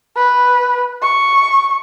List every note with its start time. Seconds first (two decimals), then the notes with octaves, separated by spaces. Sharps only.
0.16 B4
1.02 C#6